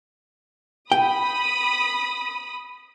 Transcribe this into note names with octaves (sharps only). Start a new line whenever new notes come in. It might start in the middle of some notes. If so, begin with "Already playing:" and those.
G5 B5 D#6